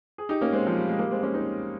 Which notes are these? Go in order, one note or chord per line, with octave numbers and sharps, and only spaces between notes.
G#4
D#4 G4
A#3 C#4
G#3 C4
F3
G3
G#3
G3 A#3
G#3 C4
A#3 C#4
C4 D#4